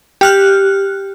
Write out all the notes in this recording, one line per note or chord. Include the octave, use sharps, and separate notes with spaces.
G4 F6 F#6